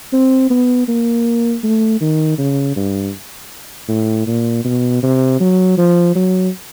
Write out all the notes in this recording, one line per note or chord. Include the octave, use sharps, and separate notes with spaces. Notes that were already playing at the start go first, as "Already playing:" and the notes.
C4
B3
A#3
A3
D#3
C#3
G2
A2
A#2
B2
C3
F#3
F3
F#3